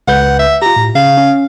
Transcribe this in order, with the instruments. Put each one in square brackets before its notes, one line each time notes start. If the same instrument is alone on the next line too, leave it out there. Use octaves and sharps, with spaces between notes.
[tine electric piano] C#2 B4 G6 [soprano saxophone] F#5
[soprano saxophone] E5
[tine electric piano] F4 G4 [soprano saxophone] A#5
[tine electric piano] A2
[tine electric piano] C#3 [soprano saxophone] F5
[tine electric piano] C#4